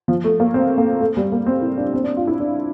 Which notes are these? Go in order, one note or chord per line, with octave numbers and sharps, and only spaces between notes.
F3
A3
A#3
C4
A#3
A3
G3
A#3
C4
E4
D4
C4
D4
F4
E4
D4